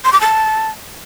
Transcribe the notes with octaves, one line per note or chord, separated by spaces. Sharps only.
C6
D6
A5